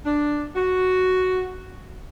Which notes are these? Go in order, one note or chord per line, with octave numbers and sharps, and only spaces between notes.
D4
F#4